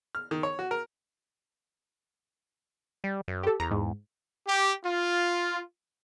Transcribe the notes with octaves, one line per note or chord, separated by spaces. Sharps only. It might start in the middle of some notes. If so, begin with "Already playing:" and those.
F6
D#3
C#5
F#4
A#4
G3
F#2
G4 A4
E2 A#5
G#2
G4
F4